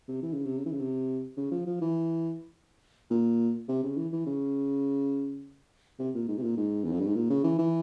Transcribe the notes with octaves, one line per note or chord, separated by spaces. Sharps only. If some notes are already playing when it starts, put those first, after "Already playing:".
C3
E3
C#3
C3
C#3
E3
C#3
C3
C#3
F3
F3
E3
A#2
C3
C#3
E3
E3
C#3
C3
A#2
G#2
C3
A#2
G#2
E2
F2
G2
G#2
A#2
C#3
E3
E3